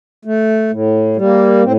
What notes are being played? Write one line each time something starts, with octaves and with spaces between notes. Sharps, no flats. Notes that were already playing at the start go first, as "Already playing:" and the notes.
A3
A2
G3 A#3
A2 C4